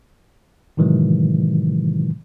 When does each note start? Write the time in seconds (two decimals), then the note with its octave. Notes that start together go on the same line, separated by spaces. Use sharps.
0.77 A2 C3 D#3 E3 F#3 G#3